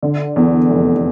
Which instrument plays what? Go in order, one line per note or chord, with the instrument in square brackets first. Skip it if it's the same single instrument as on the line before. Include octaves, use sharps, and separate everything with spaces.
[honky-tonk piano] D3
E2
F1